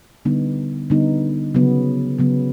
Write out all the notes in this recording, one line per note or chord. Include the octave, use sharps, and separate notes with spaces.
D3 G3 B3 D#4
D3 G3 B3 D#4
C#3 F#3 B3
C#3 F#3 B3